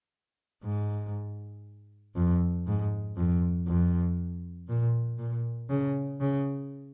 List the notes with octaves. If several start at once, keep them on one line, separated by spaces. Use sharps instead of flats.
G#2
F2
G#2
F2
F2
A#2
A#2
C#3
C#3